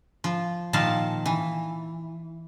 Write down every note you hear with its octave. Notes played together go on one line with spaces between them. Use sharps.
F3
A#2 D#3 F3 F5 A5
E3